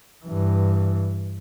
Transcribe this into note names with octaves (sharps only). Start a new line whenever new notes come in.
G2 E3